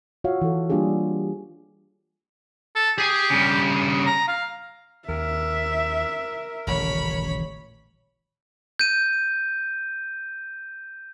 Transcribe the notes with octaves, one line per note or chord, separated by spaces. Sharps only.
F4 F#4 C#5 E5 F5
E3 A4
G3 A#3 D4 F4 G4 G#4
A4
G4 G#4 G#5
G2 C#3
A#5
F5
D#2 A#4 E5
D#1 A1 C#3 C#5 B5
G6 D#7